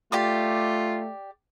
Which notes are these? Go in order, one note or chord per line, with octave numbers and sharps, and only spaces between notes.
A3 F4 G4 D5 D6